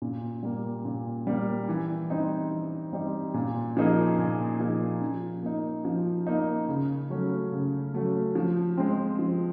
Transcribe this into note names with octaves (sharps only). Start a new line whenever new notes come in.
A#2
G3 A#3
A#2
G3 A#3
E3
G3 C4 D#4
E3
G3 C4 D#4
A#2
F3 A#3 D#4 G#4
A#2
F3 A#3 D#4 G#4
F3
A#3 D#4
F3
A#3 D#4
C#3
F#3 A3 C#4 F#4
C#3
F#3 A3 C#4 F#4
F3
G#3 C4
F3